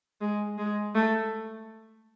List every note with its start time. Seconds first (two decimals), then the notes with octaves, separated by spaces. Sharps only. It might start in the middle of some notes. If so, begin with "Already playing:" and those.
0.21 G#3
0.58 G#3
0.95 A3